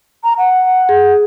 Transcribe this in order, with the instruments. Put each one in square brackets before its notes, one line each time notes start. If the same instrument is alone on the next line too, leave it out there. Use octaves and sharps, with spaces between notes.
[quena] A#5
F#5
[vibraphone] G#4